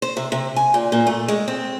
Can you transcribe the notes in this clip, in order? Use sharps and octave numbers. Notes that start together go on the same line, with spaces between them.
C5
C3
C3
G#5
A#2
A#2
A3
G#3
C4